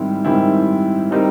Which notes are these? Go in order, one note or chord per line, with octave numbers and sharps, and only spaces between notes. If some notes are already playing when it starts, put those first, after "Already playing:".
Already playing: G#2 D#3 G3 C4 E4
G#2 D#3 G3 C4 E4
G3 C4 D#4 G4 A#4